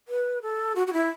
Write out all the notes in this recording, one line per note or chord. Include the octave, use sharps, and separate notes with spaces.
B4
A4
F#4
F#4
E4